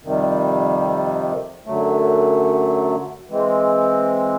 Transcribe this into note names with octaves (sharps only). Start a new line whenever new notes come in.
F2 C3 D#3 G3
F#2 D3 F#3 A3
E3 G#3 C4